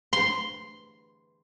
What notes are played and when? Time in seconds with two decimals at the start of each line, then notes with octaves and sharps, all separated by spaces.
0.13 C6